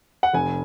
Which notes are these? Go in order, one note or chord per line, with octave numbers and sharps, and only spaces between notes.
F#5
F1 G#5